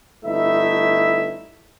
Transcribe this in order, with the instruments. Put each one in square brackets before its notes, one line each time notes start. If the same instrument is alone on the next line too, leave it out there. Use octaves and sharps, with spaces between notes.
[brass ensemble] G1 A3 D#4 E4 E5